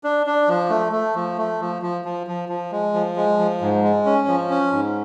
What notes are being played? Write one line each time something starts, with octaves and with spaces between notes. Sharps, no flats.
D4
D4
F3
A3
A3
F3
A3
F3
F3
F3
F3
F3
G#3
F3
G#3
F3
G#2
G#3
C#4
F3
C#4
G#2